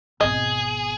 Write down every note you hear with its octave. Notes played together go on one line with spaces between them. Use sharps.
G#1 B2 G#4 D#5